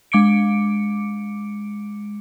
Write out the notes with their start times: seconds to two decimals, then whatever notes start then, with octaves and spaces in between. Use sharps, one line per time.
0.12 G#3 D6 C#7 D7